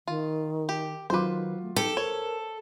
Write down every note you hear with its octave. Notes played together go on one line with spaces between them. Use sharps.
D#3 F4
G4
D#3 F#3 F4 B4 C5 D6
A3
D#4 G4 A4
A#4 C5 C#5